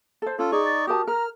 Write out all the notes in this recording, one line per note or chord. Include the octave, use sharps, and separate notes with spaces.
A4 C5
C#4 F4 A4
D#4 G#4 D5 C#6
A6
F#4 G4 A#4 A5 D#6
A#4 A#5 F6